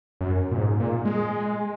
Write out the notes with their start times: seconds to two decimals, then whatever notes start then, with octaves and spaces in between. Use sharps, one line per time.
0.21 F#2
0.51 A#2
0.57 G#2
0.80 A#2
1.05 G#3